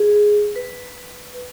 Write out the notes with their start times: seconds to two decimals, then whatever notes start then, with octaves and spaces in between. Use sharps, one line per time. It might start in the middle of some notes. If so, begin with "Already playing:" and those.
Already playing: G#4
0.56 B4